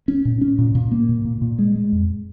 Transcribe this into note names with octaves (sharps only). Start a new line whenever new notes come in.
C#4
A#2
C#4
A#2
A#2
A#3
A#2
A#2
A#2
G#3
G#3
F2